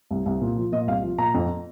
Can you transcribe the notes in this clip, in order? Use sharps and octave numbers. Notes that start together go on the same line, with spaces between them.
C2
C2
A#2
F3
A#2 D#5
C2 F5
F3
A#2 A#5
F2